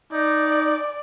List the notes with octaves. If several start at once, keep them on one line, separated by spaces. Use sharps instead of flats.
D#4 D5